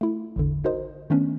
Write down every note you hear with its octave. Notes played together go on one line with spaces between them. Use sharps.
A3 E4
A1 E2 D3
D#4 F#4 A#4 C5 D#5
D#3 A3 B3 C#4 D4